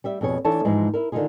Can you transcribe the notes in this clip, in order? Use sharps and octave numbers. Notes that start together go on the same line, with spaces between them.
G3 G4 E5
F2 B2 G#4 C#5
E3 D4 A4 C#5 E5 A5
G#2 E3 F3 G#3
E4 A#4
D3 D#3 A3 D#4 F4 G#4